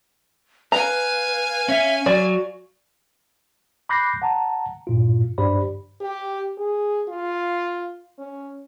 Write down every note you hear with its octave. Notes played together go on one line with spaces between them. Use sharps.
B4 F5 G#5 A#5
C#4 E5
F#3 F#4 D5
B5 D6 F#6 G6 A#6 C7
F#5 A5 A#5
G2 A#2 F4
G2 D4 G4 C5 D5 B5
G4
G#4
F4
C#4